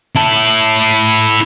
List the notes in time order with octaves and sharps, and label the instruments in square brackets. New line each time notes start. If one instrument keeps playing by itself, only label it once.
[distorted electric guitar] E4 A5